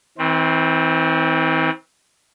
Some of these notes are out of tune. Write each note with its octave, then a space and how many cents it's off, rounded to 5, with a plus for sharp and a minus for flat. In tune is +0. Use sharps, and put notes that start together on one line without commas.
E3 -40 C4 +0